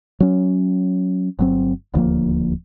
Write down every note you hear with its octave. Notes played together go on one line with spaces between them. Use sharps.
F#3 C#4
G1 F#3 C4
D#1 D2 F3 A#3